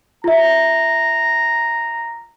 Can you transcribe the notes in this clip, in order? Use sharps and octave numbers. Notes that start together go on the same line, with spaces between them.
F4 E5 A#5